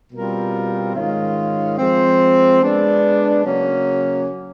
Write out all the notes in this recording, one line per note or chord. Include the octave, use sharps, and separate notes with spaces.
B2 G3 C4 F4 A#4
G#2 D#3 G#3 C#4 F4
F3 G#3 C4
G#3 B3 D4
C#3 F#3 A#3 C#4